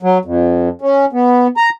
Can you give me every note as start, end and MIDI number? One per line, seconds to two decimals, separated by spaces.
0.02 0.18 54
0.25 0.69 41
0.81 1.05 61
1.13 1.47 59
1.57 1.70 82